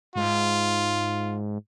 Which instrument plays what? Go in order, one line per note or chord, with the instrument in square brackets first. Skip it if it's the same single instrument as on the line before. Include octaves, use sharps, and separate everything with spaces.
[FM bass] G#2 [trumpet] F4